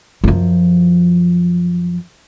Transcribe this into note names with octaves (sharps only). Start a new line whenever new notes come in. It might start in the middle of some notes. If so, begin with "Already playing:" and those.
F#2 F3